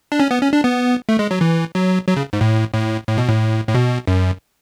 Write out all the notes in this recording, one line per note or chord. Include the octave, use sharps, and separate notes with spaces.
D4
C#4
B3
C#4
D4
B3
A3
G#3
F#3
E3
F#3
F#3
C#3
G#2
A2
A2
A2
B2
A2
A2
B2
F#2